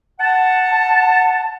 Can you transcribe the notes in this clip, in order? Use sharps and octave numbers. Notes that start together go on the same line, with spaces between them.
F#5 A5